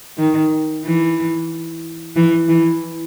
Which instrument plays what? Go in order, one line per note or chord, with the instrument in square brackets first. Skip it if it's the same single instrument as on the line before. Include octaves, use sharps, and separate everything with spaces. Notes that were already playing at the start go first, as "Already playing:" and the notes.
[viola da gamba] D#3
E3
E3
E3